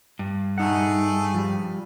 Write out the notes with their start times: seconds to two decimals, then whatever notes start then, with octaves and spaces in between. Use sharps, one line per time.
0.19 G2
0.58 A3 D#4 G#4 A4 F#5
1.34 F3 G3